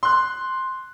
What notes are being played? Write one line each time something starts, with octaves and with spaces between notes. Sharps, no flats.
C6 F#6